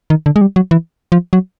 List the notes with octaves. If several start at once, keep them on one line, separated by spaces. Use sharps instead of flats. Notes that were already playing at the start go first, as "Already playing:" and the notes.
D#3
D3
G#3
G3
F#3
E3
F3
F#3